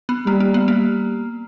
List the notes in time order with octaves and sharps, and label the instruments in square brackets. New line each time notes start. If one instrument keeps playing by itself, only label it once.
[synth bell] B3
[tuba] G3 [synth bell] A#3
[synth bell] A#3
B3
A#3